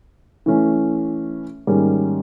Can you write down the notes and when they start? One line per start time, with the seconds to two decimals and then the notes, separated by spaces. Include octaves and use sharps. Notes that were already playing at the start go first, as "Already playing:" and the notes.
0.46 E3 A3 C#4
1.67 G#2 D#3 G3 A#3 C#4